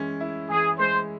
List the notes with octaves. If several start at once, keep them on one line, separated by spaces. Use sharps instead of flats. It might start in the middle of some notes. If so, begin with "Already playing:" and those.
Already playing: E3 G#3 C#4
E4
E3 G#4
G#3 C5